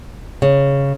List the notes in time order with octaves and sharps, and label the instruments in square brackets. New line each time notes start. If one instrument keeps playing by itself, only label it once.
[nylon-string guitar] C#3